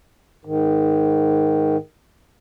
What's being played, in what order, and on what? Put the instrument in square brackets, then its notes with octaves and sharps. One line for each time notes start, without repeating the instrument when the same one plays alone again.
[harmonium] G#2 D#3